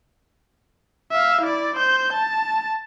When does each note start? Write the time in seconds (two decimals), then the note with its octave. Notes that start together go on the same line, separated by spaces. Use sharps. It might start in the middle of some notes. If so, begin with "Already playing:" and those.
1.11 E5 F5
1.41 E4 D5
1.75 C5 G6
2.12 A5